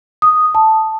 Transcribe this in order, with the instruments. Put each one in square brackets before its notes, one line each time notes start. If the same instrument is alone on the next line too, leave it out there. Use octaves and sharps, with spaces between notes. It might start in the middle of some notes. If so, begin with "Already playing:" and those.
[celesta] D#6
A5